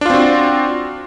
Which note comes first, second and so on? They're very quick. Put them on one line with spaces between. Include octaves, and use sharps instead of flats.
D4 F4 C4 F#4